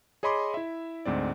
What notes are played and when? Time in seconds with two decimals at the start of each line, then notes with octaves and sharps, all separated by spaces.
0.23 G#4 C#5 D#5 B5 C6 D6
0.54 E4 E5
1.06 D2 G#2 C4 D5